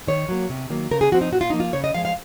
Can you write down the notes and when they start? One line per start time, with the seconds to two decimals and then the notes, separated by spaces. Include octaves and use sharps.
0.07 D#3 C#5
0.29 F#3 A#3
0.50 C3
0.70 D#3 F#3 A#3
0.91 C#3 A#4
1.01 G#4
1.12 F3 C4 F#4
1.21 D#4
1.32 A#2 F#4
1.41 F4
1.50 F3 A#3 D#4
1.60 F4
1.73 C#3 C#5
1.84 D#5
1.94 F3 F5
1.98 G#3
2.05 F5